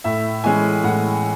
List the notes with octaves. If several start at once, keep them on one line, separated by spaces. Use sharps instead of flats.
A2 E5
E3 G#3 C#4 G#5
A2 F#5